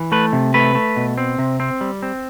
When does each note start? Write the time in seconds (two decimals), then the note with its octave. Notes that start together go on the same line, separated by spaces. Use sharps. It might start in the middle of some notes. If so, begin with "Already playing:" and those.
Already playing: E3
0.12 A3 B4
0.33 C3
0.54 A3 B4
0.75 A3
0.97 B2
1.18 C4
1.39 C3
1.60 C4
1.81 G3
2.03 C4